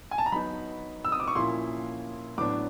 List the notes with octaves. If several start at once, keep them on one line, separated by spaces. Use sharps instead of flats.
G#5
A5
A#5
F#3 B3 D#4 B5
E6
D#6
D6
C#6
A#2 F3 A#3 C#4 E4 C6
A2 F#3 B3 D4 D6